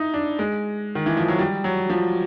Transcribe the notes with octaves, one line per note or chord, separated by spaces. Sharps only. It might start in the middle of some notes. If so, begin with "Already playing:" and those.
Already playing: D#4 E4
D4
G#3
D#3
E3
F3
F#3
G3
F#3
F3